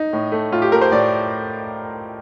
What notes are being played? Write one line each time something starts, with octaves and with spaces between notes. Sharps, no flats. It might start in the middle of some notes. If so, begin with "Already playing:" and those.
Already playing: D#4
A2
A3
A2 F4
G4
A3 A#4
C5
A2 D5